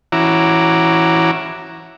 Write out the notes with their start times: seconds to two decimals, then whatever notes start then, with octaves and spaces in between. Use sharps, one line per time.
0.12 E3 C#4 E4 F#4 A#5 D6